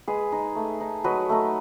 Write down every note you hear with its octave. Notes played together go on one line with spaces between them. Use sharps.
G#3 G#4 B4
D#4
A3
D#4
F#3 B4 D#5
A3 D#4